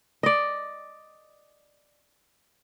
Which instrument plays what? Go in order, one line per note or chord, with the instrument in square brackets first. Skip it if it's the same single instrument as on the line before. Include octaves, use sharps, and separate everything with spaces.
[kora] D5 D#5